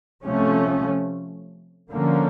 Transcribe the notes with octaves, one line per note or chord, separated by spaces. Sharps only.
C3 F3 A3 C#4
D3 F3 A#3 C#4